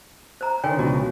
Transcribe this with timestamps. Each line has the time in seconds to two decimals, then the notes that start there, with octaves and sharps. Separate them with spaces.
0.41 C5 A#5
0.64 D3 D#3 C#5 G5 G#5
0.79 C#2 B2 F3 F#4